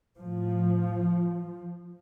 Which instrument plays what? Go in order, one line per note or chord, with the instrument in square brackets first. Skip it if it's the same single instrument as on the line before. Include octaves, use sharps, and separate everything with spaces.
[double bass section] A2 F3